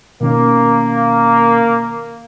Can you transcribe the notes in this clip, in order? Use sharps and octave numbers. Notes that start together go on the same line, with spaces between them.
B2 D#3 A#3 C#4